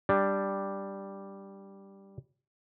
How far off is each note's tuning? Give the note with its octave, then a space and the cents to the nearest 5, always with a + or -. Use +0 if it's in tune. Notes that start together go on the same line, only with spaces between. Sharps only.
G3 +0 D4 +0